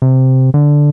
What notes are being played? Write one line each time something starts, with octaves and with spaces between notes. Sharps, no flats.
C3
D3